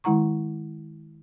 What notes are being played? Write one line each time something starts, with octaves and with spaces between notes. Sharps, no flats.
D#3 G#3 E4 F#5 A#5 C#6